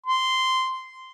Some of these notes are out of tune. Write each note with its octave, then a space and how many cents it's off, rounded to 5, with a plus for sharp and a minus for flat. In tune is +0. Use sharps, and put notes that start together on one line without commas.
C6 -10